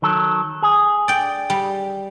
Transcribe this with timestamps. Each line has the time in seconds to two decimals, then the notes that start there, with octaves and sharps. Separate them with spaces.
0.02 D#3 F#3 A4
0.62 G#4
1.08 D5 G5
1.50 G3